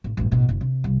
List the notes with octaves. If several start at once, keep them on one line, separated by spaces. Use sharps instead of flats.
A1
A1 G2
A1 B2
F#1
C3
C2